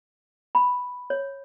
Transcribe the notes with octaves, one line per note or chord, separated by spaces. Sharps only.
B5
C#5